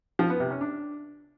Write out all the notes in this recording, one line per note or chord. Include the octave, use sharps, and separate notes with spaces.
F3
B3
C3
C#4
D4